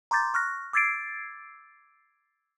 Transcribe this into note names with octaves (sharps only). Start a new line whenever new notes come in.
A#5 C6 D6 G6 A6
C#6 F6 F#6 A#6
D6 E6 G#6 A6 C7 D7